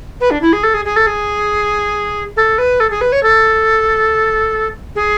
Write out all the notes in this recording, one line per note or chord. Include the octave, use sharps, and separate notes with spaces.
B4
D4
E4
G#4
A4
G#4
G#4
A4
G#4
A4
B4
A4
G#4
B4
C#5
A4
G#4